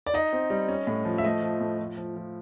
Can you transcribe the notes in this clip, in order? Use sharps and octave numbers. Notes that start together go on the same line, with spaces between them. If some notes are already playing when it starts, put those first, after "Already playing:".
D5
D#4 D#5
C4
G3
C#4
A2
F3
E5
A3 D#5
F3
A2
F3
F3
F3